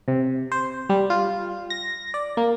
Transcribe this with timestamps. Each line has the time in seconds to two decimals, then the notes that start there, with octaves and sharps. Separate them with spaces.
0.08 C3
0.52 C5
0.89 G3
1.10 F4
1.70 A#6
2.14 D5
2.37 A#3